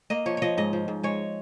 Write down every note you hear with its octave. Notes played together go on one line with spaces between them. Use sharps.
A#3 D#5
F3 C#5
F3 C#5 D#5
G#2 D#5
F3
G#2
G#3 C#5